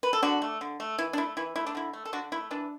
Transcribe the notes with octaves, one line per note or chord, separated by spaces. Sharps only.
B4
A4
D3 D4 F#4
A3
D3
A3
E3 E4
D4
A3 E4
E3 E4
A3 E4
D4
D3 E4
A3
A4
D3 D4 F#4
A3 E4
E3 D4